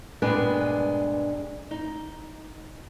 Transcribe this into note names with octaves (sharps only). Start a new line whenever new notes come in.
G2 A#2 G#3 B3 D4 B4
D#4